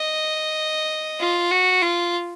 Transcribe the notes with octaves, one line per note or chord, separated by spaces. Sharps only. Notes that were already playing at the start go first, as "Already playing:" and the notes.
Already playing: D#5
F4
F#4
F4